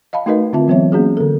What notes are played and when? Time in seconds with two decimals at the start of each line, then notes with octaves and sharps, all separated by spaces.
0.13 D#5 F5 A5 B5
0.26 A3 D#4 F#4 A#4 B4 D#5
0.53 D3 C4 F4 E5 A5
0.68 E3 F#3 B3 C4 C#5 E5
0.92 A#3 C#4 F#4 G#4
1.17 D3 A4